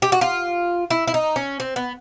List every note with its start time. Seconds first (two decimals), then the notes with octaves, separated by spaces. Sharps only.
0.02 G4
0.12 F#4
0.21 F4
0.90 E4
1.07 E4
1.14 D#4
1.36 C#4
1.60 C4
1.76 B3